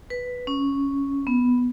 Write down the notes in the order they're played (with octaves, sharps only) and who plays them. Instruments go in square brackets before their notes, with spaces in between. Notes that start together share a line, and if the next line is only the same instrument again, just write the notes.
[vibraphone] B4
C#4
B3